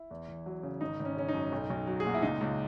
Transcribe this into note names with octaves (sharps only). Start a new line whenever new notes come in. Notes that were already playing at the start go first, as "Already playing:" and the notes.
Already playing: E4
E2
E2
F#3
C#3
G#1 D#4
G#1
C#4
C#3 C#4
D#4
F#2
B1
B1
F#3
G#4
A#2 F#4
E4
C#2 D#4
C#2